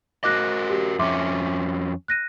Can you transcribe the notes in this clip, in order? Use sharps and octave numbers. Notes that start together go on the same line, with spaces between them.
F#4 A#4 D#5 D6 F#6 A#6
G4
F2 C#4 E5 C6 D6
F#6 A#6 D#7